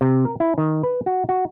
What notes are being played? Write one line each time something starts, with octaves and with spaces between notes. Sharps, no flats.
C3
A#4
E4
D#3
B4
F#4
F#4